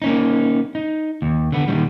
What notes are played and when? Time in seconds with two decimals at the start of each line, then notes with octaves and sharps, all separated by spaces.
0.02 A#3 C#4 D#4
0.75 D#4
1.22 D#2
1.52 D3 B3
1.68 A#2 D#3 G3